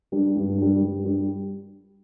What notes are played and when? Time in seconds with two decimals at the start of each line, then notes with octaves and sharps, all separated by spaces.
0.12 G3 D4
0.36 G2
0.58 G3 D4
0.81 G2
1.04 G3 D4